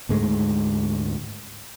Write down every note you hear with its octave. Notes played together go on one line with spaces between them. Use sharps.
D2 G#2 G#3 A3